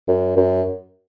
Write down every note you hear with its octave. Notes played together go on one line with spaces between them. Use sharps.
F#2
F#2